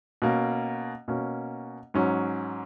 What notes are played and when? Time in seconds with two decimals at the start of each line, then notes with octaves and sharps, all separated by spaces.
0.22 B2 A#3 C#4
1.08 B2 A#3 C#4
1.94 G#2 F#3 C#4